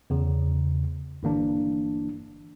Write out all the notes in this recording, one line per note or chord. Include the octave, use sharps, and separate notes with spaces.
E2 C#3
G1 E3 A#3 D4